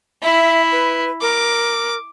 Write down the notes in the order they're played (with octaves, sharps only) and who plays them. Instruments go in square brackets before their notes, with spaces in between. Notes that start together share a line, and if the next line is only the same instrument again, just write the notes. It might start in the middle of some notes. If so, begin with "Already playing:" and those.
[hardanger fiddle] E4 [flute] E5
[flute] B4
[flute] A#4 [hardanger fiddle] D6